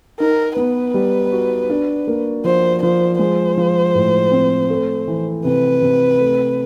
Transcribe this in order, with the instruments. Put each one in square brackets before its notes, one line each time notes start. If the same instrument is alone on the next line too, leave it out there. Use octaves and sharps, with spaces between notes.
[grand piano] D#4 [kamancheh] A#4
[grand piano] B3 [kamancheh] B4
[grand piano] G3
F#4
D4
A#3
[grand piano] F3 [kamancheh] C5
[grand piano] F3 [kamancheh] C5
[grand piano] G#3 [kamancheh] C5
[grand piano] F3
A2
C4
A3
E3
[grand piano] C3 [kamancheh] B4
[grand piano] C3
A3